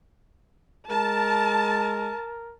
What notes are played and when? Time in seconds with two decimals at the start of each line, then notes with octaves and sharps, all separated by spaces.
0.91 G#3 A#4 A5